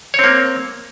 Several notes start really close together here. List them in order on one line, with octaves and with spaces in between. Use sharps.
C#5 C4 A#3